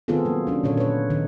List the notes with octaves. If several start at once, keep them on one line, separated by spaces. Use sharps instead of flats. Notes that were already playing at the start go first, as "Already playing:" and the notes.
D#3 B3 C4 F4 G#4 A4
F#3 A#3
B3 C#4 D4
A#2 D3 A4 C#5
B4 C#5
D#3 D#4